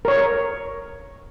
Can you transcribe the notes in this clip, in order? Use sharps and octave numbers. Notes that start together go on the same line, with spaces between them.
A#4 C#5